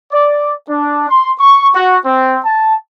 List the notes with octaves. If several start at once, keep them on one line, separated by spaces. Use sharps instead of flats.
D5
D4
C6
C#6
F#4
C4
A5